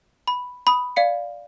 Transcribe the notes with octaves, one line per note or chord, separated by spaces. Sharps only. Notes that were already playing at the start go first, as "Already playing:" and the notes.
B5
B5 D#6
D5 F5 C#7